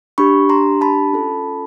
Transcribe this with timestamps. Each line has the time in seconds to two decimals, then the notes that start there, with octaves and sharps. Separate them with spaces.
0.18 D4 G4 B5 C#6
0.49 A#5 C6
0.81 A5 B5
1.13 C#4 F4 A4